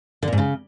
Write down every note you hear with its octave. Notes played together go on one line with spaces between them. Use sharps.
D3
A#2
G#2
C#3